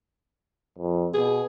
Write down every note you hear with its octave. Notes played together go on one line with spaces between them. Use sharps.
F2
B2 G#4